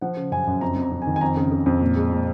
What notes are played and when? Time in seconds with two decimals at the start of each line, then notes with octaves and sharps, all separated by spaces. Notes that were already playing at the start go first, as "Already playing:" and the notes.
0.01 F3 F#5
0.17 C#3
0.32 F#2 G#5
0.47 F#2
0.61 F2 A#5
0.76 F2
0.82 A#5
0.92 F2
1.02 G#5
1.07 D#3
1.16 G#5
1.21 F2 A#5
1.37 C#3
1.52 C#3
1.66 F2
1.81 A#2
1.96 G#3
2.11 A#2